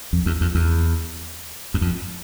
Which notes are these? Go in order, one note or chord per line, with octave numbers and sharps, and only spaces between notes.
F2
E2
F2
E2
F#2
F2